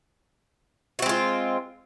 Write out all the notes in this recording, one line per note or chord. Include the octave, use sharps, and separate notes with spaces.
G#3 C4 F4 F#4